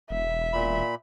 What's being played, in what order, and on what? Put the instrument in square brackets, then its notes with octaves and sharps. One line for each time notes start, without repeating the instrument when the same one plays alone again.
[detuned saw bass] E1 [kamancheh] E5
[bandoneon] A#2 B5